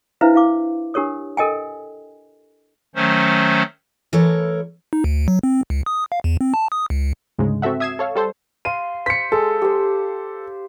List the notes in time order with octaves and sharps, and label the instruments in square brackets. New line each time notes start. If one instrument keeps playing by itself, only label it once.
[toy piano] D4 E4 B4 C5 E5 F5
E4 F5 D6
D4 G4 A#4 C#5 D#6
A4 A#4 D#5 G5 G#5
[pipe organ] D#3 F#3 A3 C#4 C5
[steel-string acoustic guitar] E3 A3 A4 A#4 C#5
[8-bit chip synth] D#4
D2
F#3
C4
C#2
D#6
F5
E2
C4
A5
D#6
C#2
[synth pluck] D2 G#2 C#3 G#3
C4 F#4 A4 E5 F#5
E5 D#6 G#6 C7 E7
A4 C#5 F5
G3 A4 C5
[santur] F5 C6 [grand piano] D#7
[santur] C5 [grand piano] B6 C#7
[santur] G#3 [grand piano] A4
[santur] G4 C5